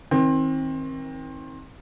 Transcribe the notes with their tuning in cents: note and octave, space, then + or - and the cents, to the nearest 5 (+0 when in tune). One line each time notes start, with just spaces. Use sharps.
D#3 +40 C4 +25